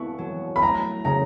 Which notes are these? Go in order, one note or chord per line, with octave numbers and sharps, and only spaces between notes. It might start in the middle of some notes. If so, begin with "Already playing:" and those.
Already playing: B3 E4 C#6
F#3
B5
A3 A#5
C#3 A#5